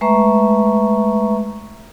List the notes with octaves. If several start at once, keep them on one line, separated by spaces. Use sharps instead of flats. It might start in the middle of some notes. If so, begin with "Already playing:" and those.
G#3 A3 B4 E5 A#5 C#6